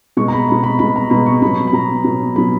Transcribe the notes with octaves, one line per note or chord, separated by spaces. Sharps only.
B2 G#3 C#6
A#5
B5
B2 G#3 B5
B5
B2 G#3 B5
A#5
B2 G#3 B5
C#6
B2 F#3 B5
B5
B2 F#3 A#5
B2 F#3
B2 F#3 B5